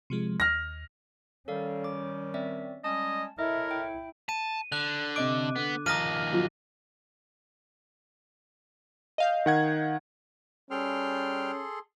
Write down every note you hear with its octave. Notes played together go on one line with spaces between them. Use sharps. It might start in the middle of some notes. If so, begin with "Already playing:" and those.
C3 F3 G#3
D#2 F6 A#6
D#3 G3 C#4 A4 D5 F5
D6
C4 D5 E5
G3 G#3 C#4 D#5 A5
E4 A4 A#4 C#5 D#5 E5
G5
A5 D#7
D3 F#6
C3 D#5 D6 D7
D3 B3
D#3 F3 A#5 D#6 F6 A#6 D#7
F#3 F4
D#5 F5 G6
D#3 F#5 G#6
G3 C#4 G#4 A4 G5 C6 F6